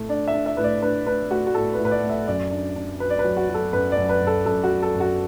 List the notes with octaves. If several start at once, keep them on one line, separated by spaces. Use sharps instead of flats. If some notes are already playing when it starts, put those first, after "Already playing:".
Already playing: A2 A3
D4 D5
E5
D4
E5
A2 B4
D5
D4 B4
D4 B4
A3 F#4
F#4
A2 A4
B4
A2
B4
D5
A3
E5
F#2 D5
D4
D4
F#3 B4
D5
B4
F#3
F#4
F#3 A4
F#2 B4
D5
F#2
B4
F#2
A4
F#2 A4
F#4
F#3
A4
F#2
F#4